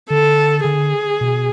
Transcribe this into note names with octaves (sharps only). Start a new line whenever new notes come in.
D3 A4
D3 G#4
B2